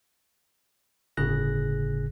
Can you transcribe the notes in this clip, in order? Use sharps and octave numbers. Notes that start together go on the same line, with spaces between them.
G1 A2 C#3 G#4 F#6 A#6